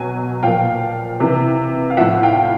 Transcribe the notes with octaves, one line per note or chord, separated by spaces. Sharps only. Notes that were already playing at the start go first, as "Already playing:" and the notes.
Already playing: B2 F#3 G#5
A#2 F3 F5 G5
C3 E3
F5
A2 F3 E5 F#5
F5 G5